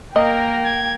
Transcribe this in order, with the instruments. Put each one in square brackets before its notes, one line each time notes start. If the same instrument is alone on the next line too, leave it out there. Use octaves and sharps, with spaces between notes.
[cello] A#3 [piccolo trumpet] A#4 [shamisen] D#5 [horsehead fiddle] G5
[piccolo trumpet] G#6